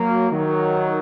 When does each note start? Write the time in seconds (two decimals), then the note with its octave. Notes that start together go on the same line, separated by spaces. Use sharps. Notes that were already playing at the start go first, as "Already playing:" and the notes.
Already playing: F#3 A#3
0.31 D#3 F#3